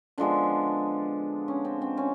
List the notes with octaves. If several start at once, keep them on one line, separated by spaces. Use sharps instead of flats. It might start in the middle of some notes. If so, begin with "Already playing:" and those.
D3 F3 G#3 B3 D4
C#4
C4
C4
C#4